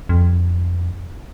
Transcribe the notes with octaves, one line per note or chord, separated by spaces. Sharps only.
F2